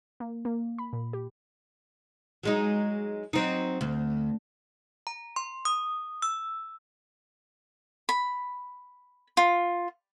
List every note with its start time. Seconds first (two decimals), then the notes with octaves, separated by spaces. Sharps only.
0.20 A#3
0.45 A#3
0.78 B5
0.93 A#2
1.13 G4
2.43 F#3 G#3 D#4
3.33 F#3 C4 D#4
3.81 D2
5.07 A#5
5.36 C6
5.65 D#6
6.22 E6
8.09 B5
9.37 F4